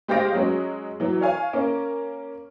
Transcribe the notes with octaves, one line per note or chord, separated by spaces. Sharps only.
G#3 G4 C5 F5 A#6 D7
F#3 G#3 C#4
E3 F#3
C#5 F5 G#5
A#3 C#4